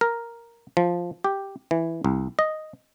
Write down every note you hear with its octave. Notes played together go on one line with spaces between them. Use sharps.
A#4
F3
G4
E3
C2
D#5